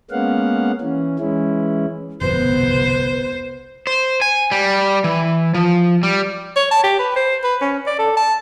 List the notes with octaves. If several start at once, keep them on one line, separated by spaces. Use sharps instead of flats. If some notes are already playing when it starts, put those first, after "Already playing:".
G#3 A#3 B3 C#4 F5 F#5
E3 C#4
E3 G#3 C#4 E4
G1 C2 F2 B2 B3 B4 C5
C5
G#5
G3
E3
F3
G3
C#5
A5
G4
B4
C5
B4
C#4
D5
A4
A5